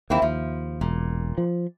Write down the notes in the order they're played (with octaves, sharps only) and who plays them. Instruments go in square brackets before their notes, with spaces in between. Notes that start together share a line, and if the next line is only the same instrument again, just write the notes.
[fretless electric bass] D#2 [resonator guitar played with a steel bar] A#3 C4 E4
[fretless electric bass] D#2 [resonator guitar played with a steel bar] F3
[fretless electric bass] E1 [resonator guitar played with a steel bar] A#2
[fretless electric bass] F3